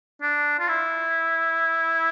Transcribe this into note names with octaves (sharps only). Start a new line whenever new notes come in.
D4
F4
E4